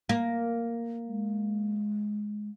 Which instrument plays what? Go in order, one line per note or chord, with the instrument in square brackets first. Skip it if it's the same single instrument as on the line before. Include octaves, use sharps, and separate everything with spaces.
[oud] A#3
[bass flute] G#3